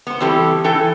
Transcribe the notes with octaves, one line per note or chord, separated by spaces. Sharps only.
B3 C5
E3 G3 C4 G4 A4
E3 A4 G5